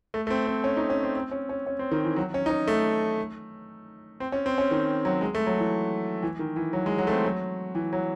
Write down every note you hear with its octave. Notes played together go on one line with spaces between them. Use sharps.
A3
A3
C4
C4
C#4
D#4
C#4
C4
C4
C#4
C#4
C#4
C4
D#3
E3
F#3
C#4
D#4
C#4
A3
C4
C#4
C4
C#4
D#3
F#3
G#3
A3
F#3
E3
E3
D#3
E3
F#3
G#3
F#3
A3
C4
F#3
E3
F#3